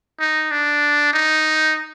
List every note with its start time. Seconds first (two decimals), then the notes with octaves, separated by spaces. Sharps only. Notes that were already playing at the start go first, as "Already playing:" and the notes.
0.20 D#4
0.51 D4
1.13 D#4